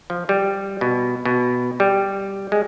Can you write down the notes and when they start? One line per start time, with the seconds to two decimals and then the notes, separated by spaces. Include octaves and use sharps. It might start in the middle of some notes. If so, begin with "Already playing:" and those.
0.10 F3
0.29 G3
0.81 B2
1.25 B2
1.80 G3
2.52 G#3